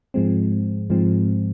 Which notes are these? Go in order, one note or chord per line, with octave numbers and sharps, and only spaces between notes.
G#2 F3 G#3 C4
G#2 F3 G#3 C4